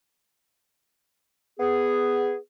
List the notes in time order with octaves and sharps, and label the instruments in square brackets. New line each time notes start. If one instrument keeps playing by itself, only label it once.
[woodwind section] B3 G#4